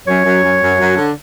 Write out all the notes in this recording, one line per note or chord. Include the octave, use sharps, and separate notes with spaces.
F#2 C#5
F#2
F#2
F#2
F#2
D3